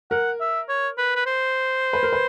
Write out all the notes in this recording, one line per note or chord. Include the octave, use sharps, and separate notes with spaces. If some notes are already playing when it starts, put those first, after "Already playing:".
A#4 F#5
E5
C#5
B4
B4
C5
B4
A#4
B4